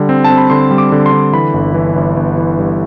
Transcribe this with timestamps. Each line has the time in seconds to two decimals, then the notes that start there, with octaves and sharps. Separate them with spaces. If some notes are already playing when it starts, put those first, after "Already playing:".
Already playing: D3 G3
0.09 C4
0.24 A5
0.30 C4
0.37 B5
0.50 D3 C6
0.71 G3
0.78 D6
0.92 D3
1.06 C6
1.12 D3
1.33 E3 B5
1.54 G1
1.74 E3
1.96 G1
2.17 G1
2.37 E3
2.58 G2